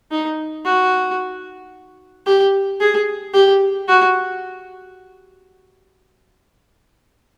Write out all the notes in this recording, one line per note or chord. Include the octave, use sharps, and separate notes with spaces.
D#4
F#4
G4
G#4
G4
F#4